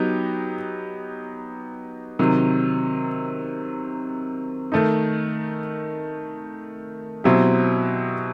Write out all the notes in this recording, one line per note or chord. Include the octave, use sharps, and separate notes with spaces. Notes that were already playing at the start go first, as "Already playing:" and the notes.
Already playing: F#3 B3 D#4 G4
C3 D#3 F#3
D#3 A3 D#4
B2 F#3 C4 E4 G4